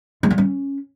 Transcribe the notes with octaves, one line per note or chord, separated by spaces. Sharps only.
G#3
G3
C#4